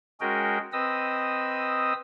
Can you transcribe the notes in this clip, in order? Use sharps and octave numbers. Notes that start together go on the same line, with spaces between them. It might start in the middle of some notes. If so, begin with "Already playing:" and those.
G#3 C#4 F#4 G#4 A#4 G5
C4 B4 D#5 D#6 E6